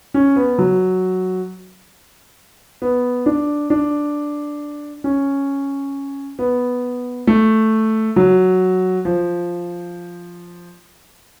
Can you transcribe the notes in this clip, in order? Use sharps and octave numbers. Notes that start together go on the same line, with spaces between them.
C#4
B3
F#3
B3
D4
D4
C#4
B3
A3
F#3
F3